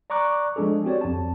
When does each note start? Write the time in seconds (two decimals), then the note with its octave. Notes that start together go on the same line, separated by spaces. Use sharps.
0.10 D5 A#5 C#6 D6 F#6
0.56 F3 G#3 D4 G#4 A4
0.84 C4 F#4 G4 C#5 D5
1.01 F2 A5